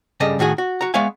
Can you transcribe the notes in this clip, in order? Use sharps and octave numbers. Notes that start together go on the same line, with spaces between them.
G2 C#3 G3 A4 D#5
A2 D#3 F#4 G#4
F#4
F#4 A#5
G#3 B3 C#5 E5 F5 G#5